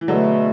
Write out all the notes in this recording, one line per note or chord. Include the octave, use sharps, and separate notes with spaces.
E3
E2 B2 D3 F#3 A3